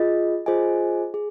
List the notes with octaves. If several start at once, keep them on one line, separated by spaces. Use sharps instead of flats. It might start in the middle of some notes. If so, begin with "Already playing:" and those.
Already playing: F4 G#4 D#5
F4 G#4 C5 D#5 G#5
G#4